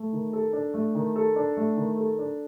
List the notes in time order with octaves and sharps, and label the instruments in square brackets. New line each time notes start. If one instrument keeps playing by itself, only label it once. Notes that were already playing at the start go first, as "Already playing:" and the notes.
Already playing: [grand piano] A3
D#3
A4
D4
A3
D#3
A4
D4
A3
D#3
A4
D4